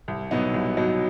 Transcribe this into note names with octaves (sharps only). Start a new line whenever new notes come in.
C2
B2 F#3 B3 D#4
C2
B2 F#3 B3 D#4